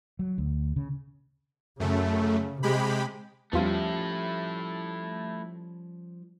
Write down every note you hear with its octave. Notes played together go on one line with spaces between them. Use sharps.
F#3
D2
C#3
F#2 C#3 A3
C3 G#3 G4 B5
E2 F3 G3 A3 C#4 E4 F4